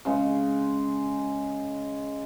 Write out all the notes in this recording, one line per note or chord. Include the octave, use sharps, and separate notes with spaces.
C#3 G#3